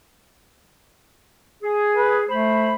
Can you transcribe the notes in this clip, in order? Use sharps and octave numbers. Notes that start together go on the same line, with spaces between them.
G#4
B4
A3 C5 B5